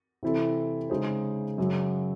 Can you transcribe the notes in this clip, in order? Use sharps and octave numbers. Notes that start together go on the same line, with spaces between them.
C3 E3 C4 E4 A4
C#3 G#3 D#4 G#4 C5
F#2 C#3 F#3